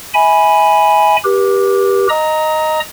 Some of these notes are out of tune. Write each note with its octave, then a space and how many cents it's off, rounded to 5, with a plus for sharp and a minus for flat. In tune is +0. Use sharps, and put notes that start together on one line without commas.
E5 -35 G#5 +0 B5 +0
G4 +0 B4 -45
D#5 +0 A#5 +0 D#6 +35